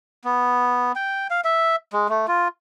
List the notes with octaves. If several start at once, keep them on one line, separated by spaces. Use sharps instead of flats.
B3
G5
F5
E5
G#3
A3
F4